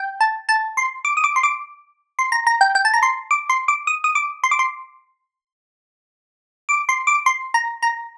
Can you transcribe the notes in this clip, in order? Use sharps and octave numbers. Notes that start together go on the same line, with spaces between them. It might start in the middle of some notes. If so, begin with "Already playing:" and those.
Already playing: G5
A5
A5
C6
D6
D#6
D6
C6
D6
C6
A#5
A#5
G5
G5
A5
A#5
C6
D6
C6
D6
D#6
D#6
D6
C6
D6
C6
D6
C6
D6
C6
A#5
A#5